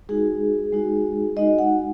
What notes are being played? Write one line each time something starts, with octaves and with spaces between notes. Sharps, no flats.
G#3 D#4 F#4 G#4
G#3 D#4 F#4
G#3 D#4 F#4 D#5
F#5